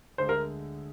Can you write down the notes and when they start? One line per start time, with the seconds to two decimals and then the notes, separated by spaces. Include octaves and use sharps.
0.18 D2 D3 G#3 C5
0.29 A#4